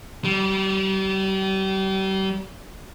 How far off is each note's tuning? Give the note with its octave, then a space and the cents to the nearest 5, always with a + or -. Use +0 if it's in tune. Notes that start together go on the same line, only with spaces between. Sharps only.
G3 -35